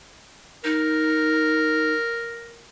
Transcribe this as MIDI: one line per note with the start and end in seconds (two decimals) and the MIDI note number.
0.64 1.93 63
0.64 2.67 70